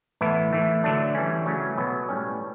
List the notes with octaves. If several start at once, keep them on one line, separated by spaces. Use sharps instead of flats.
A2 E3 B3 E4
A2 E3 A3
D3 F#3 A3 D4
E3 G3 C#4
C#3 F#3 A3 C#4
B2 F#3 B3
A2 G3 C#4